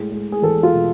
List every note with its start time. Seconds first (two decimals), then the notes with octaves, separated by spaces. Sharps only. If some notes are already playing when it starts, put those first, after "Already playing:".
Already playing: A2 G#3
0.12 G#3
0.32 G#4
0.42 E2 A4
0.63 F4
0.74 B2